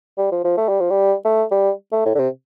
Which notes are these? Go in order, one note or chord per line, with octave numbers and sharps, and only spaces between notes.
G3
F3
F3
A3
G3
F3
G3
A3
G3
A3
A2
D3
C3